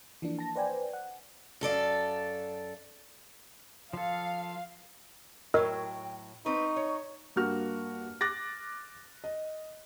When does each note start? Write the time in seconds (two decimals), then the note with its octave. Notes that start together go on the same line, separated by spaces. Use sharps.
0.22 E3 F3 A#3 D4
0.39 A5 A#6
0.56 B4 C5 D5 G5 G#5
0.93 F#5
1.61 F#2 A4 D5 F5
3.93 F3 A4 F5
5.54 A2 F#3 A#4 D#5 G5 E6
6.46 C4 D#4 B4 C#6
6.76 C#5
7.36 G2 A#3 F#4 F6
8.21 D6 F#6 A6 A#6
9.24 D#5